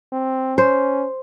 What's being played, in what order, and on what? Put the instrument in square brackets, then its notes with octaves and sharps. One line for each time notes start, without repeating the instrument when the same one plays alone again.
[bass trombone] C4
[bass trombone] C#4 [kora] C5